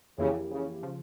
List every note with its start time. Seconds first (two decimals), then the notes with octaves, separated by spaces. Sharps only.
0.18 F2 C#3 E3 A#3 E4 G4
0.51 C#3
0.83 C#3 F3